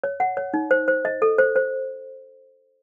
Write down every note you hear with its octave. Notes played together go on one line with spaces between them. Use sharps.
C#5
F#5
C#5
D#4
C5
C5
D#5
A4
C5
C5